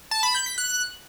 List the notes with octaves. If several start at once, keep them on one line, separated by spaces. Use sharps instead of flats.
A5
B5
G6
B6
F#6